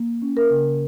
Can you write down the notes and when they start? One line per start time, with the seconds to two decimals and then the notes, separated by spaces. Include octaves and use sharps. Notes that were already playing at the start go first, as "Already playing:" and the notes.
Already playing: A#3
0.22 C#4
0.37 A#4
0.50 C#3